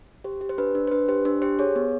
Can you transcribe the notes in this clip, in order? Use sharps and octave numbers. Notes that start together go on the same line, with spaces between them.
G4 C5
G4
C5
D4 B4
D4
C5
D4 B4
G4 C5
D4 C5
G4 C5
G#4 C#5
B3